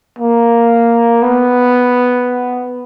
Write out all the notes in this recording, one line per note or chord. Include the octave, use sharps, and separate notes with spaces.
A#3
B3